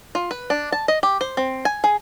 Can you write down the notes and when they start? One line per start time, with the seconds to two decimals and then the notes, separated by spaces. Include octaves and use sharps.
0.15 F4
0.31 B4
0.50 D4
0.72 A5
0.88 D#5
1.03 G4
1.21 C5
1.37 C4
1.65 G#5
1.84 G#4